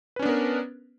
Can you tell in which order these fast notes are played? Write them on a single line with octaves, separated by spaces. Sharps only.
B4 C#4 D4 B3 A#4